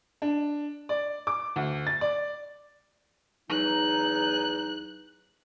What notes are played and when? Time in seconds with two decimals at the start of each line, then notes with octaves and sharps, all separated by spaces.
0.22 D4
0.89 D5
1.27 D6
1.56 D2
1.87 A6
2.01 D5
3.50 E2 F#3 D#4 F#6